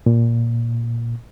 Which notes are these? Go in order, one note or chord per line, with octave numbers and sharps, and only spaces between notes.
A#2